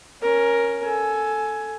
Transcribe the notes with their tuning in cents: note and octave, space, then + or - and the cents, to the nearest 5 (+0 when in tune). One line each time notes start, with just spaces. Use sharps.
C#4 +0 A#4 +10
A4 +0 G#5 +15